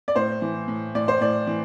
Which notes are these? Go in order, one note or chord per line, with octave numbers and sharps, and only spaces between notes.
D5
A2 C5
E3
A2
A2 D5
C5
A2 D5
E3